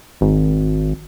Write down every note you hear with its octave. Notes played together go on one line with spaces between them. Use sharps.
G#1